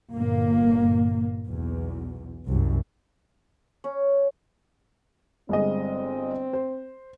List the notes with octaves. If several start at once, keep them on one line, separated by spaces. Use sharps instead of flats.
G1 A#2 A#3
B1 E2
C2 F#2
C#4
G1 G#3 C4 D#5
C5